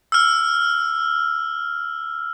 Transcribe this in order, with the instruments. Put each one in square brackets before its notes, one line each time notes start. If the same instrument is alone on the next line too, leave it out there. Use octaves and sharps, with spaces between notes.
[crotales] E6 F6